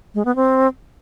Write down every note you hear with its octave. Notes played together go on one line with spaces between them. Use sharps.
G#3
B3
C4